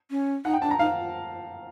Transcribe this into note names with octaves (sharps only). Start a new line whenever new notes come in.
C#4
D#4 F#5
G5
D4 A5
A#5
D#4 F5